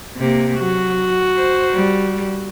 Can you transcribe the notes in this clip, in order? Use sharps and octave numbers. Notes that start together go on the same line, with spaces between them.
C3 A#3
F#3 F#4
C5
G3